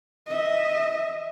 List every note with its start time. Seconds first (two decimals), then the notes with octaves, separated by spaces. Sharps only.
0.27 D#5 E5